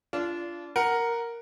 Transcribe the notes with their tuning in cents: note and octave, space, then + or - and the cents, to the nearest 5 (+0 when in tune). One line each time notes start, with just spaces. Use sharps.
D4 -25 F4 -25
A#4 +0 F#5 +0